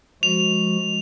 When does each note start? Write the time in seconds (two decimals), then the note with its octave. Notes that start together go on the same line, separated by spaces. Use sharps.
0.23 F3 G#3 F#4 F7